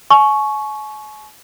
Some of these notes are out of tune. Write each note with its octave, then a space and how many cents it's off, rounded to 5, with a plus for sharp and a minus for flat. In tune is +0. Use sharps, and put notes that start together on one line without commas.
G#5 +40 C#6 +0